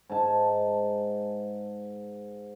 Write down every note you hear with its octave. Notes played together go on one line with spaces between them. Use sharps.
G#2 A5